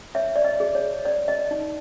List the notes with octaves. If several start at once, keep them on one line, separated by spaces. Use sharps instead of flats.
C#5 E5
D5
D#5
G#4
C#5
C#5 D5
D#5
D#4